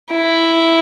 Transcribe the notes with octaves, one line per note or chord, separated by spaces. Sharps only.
E4